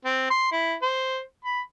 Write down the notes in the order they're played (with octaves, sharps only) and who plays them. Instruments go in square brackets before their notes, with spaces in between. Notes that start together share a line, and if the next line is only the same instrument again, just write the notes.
[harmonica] C4
C6
E4
C5
B5